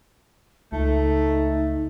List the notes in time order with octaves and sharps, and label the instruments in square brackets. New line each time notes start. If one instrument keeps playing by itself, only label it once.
[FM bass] C#2 [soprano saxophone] A3 [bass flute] D#4